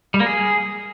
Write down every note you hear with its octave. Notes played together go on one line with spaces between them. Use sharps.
G3
A#3
G#4